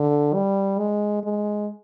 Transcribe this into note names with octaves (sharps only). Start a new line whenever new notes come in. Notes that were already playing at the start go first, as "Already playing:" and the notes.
Already playing: D3
G3
G#3
G#3